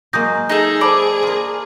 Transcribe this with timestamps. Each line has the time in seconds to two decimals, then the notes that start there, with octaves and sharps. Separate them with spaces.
0.13 F#3 G#3 A#3 D#6 G6 A#6
0.50 D#4 G#4 A4
0.81 C5 D5 A5 B5
1.23 F4 A#4